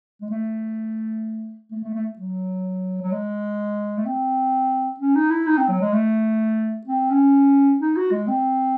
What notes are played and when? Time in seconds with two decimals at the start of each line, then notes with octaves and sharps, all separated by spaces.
0.21 G#3
0.30 A3
1.71 A3
1.83 A3
1.94 A3
2.19 F#3
3.02 F#3
3.12 G#3
3.98 A3
4.05 C4
5.00 C#4
5.15 D#4
5.30 E4
5.46 D#4
5.57 C4
5.69 F#3
5.81 G#3
5.93 A3
6.87 C4
7.10 C#4
7.80 D#4
7.96 F#4
8.11 G#3
8.27 C4